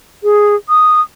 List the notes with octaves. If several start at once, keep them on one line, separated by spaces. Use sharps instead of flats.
G#4
D#6